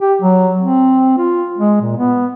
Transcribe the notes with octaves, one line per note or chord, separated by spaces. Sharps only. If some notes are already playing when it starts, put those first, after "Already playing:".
G4
F#3
C4
F4
G#3
A#2
B3